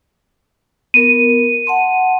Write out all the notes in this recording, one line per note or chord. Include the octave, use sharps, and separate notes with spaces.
B3 A#4 D#7
F#5 A5 C6